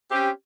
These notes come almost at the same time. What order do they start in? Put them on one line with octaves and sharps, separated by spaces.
C4 G4 C#4